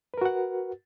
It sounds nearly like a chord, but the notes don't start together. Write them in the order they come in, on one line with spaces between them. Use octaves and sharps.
B4 A#4 F#4 F#5